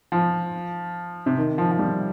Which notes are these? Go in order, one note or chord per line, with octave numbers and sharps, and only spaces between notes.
F3
C3
D#3
F3
F3
G3